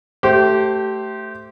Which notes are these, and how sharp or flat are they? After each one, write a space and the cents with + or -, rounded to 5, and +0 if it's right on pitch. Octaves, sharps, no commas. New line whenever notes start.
A3 +0 G4 -25 C5 +0